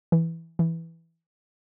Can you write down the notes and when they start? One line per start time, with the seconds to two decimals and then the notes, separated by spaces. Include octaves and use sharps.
0.12 E3
0.59 E3